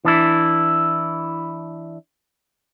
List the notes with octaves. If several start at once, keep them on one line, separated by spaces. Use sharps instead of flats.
E3 D4 E4